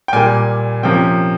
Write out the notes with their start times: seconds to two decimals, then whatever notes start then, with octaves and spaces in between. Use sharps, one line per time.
0.08 G5
0.13 A#2 G3 A#3 G#5
0.83 C3 F3 A#3 C#4 G5